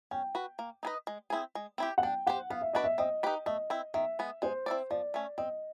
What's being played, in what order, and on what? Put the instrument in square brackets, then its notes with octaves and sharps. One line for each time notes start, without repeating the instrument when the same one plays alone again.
[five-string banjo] C#4 [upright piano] G5
[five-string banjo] F#4 B4
A#3
D#4 G#4 B4 D#5
G#3
C4 E4 G#4
G#3
C4 E4 G4
[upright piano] F#5
[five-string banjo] D4 [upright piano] G5
[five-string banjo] G4 C5 [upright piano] F#5
[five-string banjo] B3 [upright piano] F5
[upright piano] E5
[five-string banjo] D4 F#4 B4 D5 [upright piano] D#5
[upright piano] E5
[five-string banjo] C4 [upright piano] D#5
[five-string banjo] D#4 G4 B4
[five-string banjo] A3 [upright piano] D#5
[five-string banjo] C4 E4
[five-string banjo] D#3 [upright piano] E5
[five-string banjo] G#3 B3
[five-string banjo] G#3 [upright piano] C5
[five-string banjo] C4 E4 A4 D5
[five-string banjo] F3 [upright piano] D5
[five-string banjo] A3 C#4
[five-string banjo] C4 [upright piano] D#5